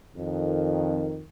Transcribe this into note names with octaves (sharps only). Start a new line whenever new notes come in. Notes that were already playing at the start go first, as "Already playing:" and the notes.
F2 D#3